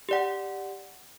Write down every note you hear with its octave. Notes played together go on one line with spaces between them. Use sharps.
G4 D5 F#5